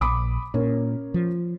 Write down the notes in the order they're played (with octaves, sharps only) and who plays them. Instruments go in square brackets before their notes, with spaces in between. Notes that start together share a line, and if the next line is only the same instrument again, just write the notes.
[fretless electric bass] A#1 [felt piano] B5 D6 D#6
[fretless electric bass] A#2 [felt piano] C#4 A#4 C#5
[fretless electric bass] F3